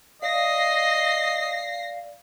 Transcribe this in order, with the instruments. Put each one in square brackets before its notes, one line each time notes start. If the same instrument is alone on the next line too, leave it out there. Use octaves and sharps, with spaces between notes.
[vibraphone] D5 F5 [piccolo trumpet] D#5 [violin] A#6 C7